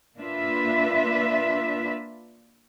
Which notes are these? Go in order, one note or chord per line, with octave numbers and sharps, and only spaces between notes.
A#3 D4 F4 B4 E5